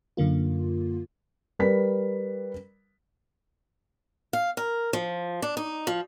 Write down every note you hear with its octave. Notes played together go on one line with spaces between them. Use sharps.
F#2 D3 A#3 F4
G3 A#4 B4 B6
F5
A#4
F3
D4
D#4
F3